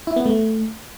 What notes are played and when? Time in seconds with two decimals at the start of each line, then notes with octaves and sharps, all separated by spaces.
0.07 E4
0.16 B3
0.26 A3